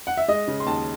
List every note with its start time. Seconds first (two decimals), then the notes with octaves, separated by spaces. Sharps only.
0.07 F#5
0.17 E5
0.28 G#3 D#5
0.48 C#3
0.60 C6
0.66 D#2 A5